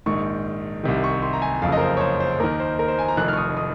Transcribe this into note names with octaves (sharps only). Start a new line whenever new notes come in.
A#1 G#2 D#3 C#6
C2 C3 D#3
C#6
C6
A#5
G#5
F#1 F2 C#3 F5
D#5
A#4
C5
C#5
C5
C5
D#2 D#3 A#4
C5
A#4
C5
G#5
A#5
F1 F2 D#3 F#6
F6
C#6
D#6
D#6